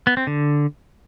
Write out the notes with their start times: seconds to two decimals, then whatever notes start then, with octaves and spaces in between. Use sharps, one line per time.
0.07 B3
0.17 C4
0.27 D3